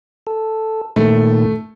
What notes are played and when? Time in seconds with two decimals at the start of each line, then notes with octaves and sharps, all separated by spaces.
0.27 A4
0.96 A#2 D#3 A3